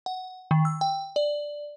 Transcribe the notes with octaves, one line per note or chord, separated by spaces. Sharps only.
F#5
D#3
E6
G5
D5